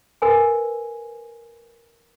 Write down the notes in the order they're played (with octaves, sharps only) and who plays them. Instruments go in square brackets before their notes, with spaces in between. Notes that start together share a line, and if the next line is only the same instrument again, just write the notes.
[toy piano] A#4 B4 G#5